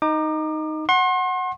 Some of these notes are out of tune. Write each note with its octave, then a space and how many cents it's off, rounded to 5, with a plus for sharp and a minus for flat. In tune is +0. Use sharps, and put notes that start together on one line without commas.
D#4 +0 D6 +35
F#5 +0 C6 +40